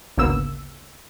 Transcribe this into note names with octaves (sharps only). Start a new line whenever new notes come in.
G#1 D2 C#3 A#3 B3 E6